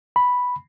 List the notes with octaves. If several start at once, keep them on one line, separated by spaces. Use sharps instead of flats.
B5